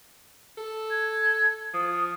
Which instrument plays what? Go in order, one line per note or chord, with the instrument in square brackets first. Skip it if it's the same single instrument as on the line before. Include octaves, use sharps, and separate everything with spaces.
[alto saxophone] A4
[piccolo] G#6
[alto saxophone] F3 [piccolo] D#6